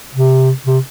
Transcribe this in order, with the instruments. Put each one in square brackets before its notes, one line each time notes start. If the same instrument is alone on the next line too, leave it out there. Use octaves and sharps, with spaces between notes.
[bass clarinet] C3
C3